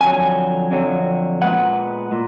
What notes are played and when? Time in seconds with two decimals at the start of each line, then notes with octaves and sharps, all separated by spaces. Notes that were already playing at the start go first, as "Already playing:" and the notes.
0.01 F2 D3 F#3 G#5
0.71 F2 D3 F#3
1.42 A#2 G#3 B3 F#5
2.12 A#2